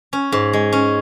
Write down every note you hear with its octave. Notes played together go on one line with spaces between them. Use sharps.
C#4
G#2
G#3
C#4